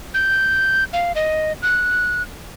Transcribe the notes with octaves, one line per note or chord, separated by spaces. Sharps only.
G6
F5
D#5
F#6